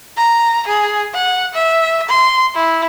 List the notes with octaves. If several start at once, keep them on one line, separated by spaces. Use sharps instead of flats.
A#5
G#4
F#5
E5
C6
E4